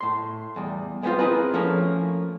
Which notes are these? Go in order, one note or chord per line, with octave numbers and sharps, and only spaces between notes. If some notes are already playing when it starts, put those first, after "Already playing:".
A2 C6
E2 G3
G#3 B3 C4 D#4 F4
C4 E4 F4 G#4 A#4 B4
F3 A3 A#3 C#4